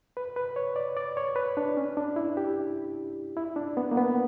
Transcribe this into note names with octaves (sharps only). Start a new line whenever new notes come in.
B4
B4
C#5
D5
D5
C#5
B4
D4
C#4
D4
E4
G4
E4
D4
B3
A#3
B3